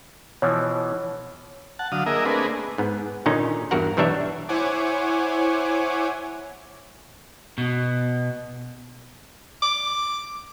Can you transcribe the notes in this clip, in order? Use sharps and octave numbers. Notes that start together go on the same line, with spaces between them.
B2 E3 F3 C#5
F#5 A5
D3 F#3 F5 D#6
A#3 G#4 A#4 D#5 E5
A3 A#3 C4 D4 G#4 B4
G#2 B3
A#2 D3 D#3 C#4 D#4
E2 G2 F#4 A#4 F#5
B1 E3 G3 D4 C#5 E5
E4 C5 C#5 F#5 G#5 D6
B2
D6